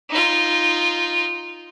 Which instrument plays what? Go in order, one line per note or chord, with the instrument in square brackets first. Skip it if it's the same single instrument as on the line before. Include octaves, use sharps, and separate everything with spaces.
[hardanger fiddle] D#4 F4